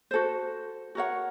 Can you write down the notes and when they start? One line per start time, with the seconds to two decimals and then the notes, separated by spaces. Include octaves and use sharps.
0.11 F#4 A4 C5
0.95 F#4 A#4 C#5 F#5